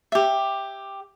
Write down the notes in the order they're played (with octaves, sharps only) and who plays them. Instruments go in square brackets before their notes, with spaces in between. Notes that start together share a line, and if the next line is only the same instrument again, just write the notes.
[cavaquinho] G4 E5